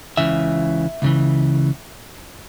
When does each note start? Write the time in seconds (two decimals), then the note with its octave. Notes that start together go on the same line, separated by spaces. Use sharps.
0.17 C#2 C#3 E3 E5
1.02 C#2 C#3 E3